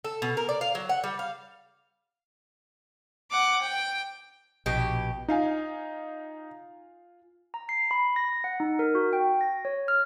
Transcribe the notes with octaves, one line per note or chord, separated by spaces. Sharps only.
A4
B2
A#4
D5
F5
F#3
F#5
G3
F5
F#5 D6
G5
A#1 B2 G4
D#4 F4 F5 G#5
A#5
C7
B5
A#6
F#5
D#4
A#4
F#4
G5
A#6
C#5
F6